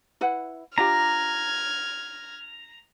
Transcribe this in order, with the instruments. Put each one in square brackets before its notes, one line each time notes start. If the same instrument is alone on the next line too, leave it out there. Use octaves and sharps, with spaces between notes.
[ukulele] E4 B4 F#5
[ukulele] D4 F4 G4 [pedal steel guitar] A#5 [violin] F6 G#6